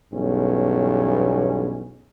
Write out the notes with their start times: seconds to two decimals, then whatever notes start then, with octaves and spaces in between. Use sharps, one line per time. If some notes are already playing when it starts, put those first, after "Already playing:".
0.13 B1 E2 G2 C#4